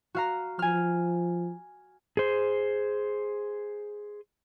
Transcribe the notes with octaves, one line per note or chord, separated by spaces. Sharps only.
F#4 F5 A#5
F3 G#5 F6
G#4 C5